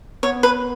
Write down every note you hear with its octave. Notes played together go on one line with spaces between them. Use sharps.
B3 C#5
B4